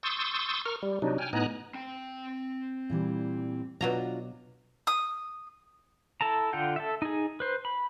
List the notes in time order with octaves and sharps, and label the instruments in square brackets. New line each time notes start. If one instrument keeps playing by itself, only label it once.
[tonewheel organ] C6 C#6 D#6 E6 G6 A6
A#4 C#6 F6
G3
C3 F#3 D4 D#4
G5 G#5 F6
A2 B3 D#4 G#5 A#5 F#6
[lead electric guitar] C4 G5
[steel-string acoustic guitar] A#2 E3 G3
[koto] B2 F#3 A#5 [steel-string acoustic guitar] D4 F4 F#4
[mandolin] D#6
[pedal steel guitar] E4 A4 A5 A#5
D3 F4 F#5 G5
A4 E5
D#4 G#4
B4 C5
B5